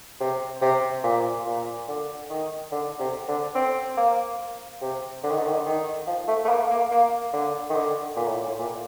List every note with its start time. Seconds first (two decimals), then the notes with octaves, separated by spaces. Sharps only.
0.20 C3
0.62 C3
1.04 A#2
1.46 A#2
1.88 D3
2.30 D#3
2.72 D3
2.99 C3
3.28 D3
3.55 C4
3.97 A#3
4.81 C3
5.24 D3
5.31 D#3
5.39 D3
5.46 D#3
5.54 D3
5.66 D#3
6.07 F3
6.28 A3
6.45 A3
6.49 A#3
6.70 A#3
6.92 A#3
7.33 D3
7.70 D#3
7.75 D3
8.17 A#2
8.27 A2
8.47 A2
8.59 A#2